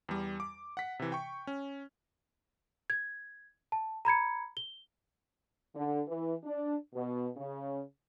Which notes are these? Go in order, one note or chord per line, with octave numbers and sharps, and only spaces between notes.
E2 G3
D6
F#5 B6
C3 E3
G5 C#6
C#4
G#6
A5
A#5 B5 G#6 C#7
G7
D3
E3
D4
B2
C#3